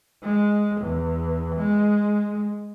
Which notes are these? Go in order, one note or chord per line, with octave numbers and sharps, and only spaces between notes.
G#3
E2
G#3